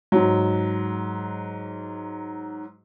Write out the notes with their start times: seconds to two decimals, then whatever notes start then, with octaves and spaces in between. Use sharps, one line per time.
0.12 G#2 F#3